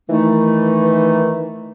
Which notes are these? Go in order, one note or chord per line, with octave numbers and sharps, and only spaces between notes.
D#3 E3 A3 D#4